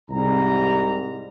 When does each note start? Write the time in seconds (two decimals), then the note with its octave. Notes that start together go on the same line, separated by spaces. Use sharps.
0.10 C2 G#2 G3 A#5